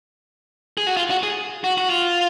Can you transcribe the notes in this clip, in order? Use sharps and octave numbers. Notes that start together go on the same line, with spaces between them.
G#4
F#4
F4
F#4
G#4
F#4
F#4
F4